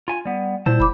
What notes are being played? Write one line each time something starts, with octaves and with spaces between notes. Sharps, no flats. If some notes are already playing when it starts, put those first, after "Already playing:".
F4 G#5
G3 B3
A#2 G3 E4 C5 A5
F#1 B5 D6